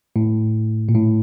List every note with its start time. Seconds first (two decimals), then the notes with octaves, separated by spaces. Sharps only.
0.16 A2
0.89 A#2
0.95 A2